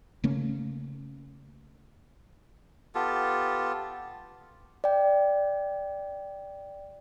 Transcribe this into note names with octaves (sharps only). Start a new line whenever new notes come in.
C#3 A3 A#3 C#4
B3 F4 G4 A4
D5 G5